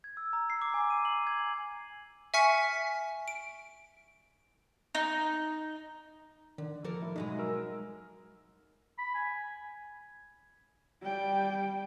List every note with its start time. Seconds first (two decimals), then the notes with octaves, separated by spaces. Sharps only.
0.04 G#6
0.17 E6
0.33 A#5
0.50 C7
0.62 D6
0.74 G#5
0.90 D#7
1.05 F#7
1.27 G#6
1.40 G#5
2.34 E5 G#5 C#6 F6 B6 C#7
3.28 D7
4.95 D#4
6.58 D3 D#3
6.84 F3 A#3 A4 A#4
7.02 A2
7.16 B2 F#3 G#3 D#4
7.39 A#4 E6
8.98 B5
9.14 G#5
11.01 G3 G5